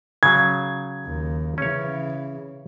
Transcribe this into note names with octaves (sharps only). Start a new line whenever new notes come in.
C#3 F#3 G#6
D#2
C#3 E3 C#4 C#5